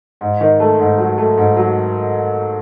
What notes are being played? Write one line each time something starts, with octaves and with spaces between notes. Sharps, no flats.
G#2
D#3
A3
G#2
F#3
A3
G#2
F#3